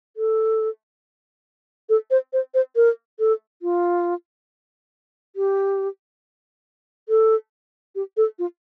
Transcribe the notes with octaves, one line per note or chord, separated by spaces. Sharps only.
A4
A4
C5
C5
C5
A#4
A4
F4
G4
A4
G4
A4
F4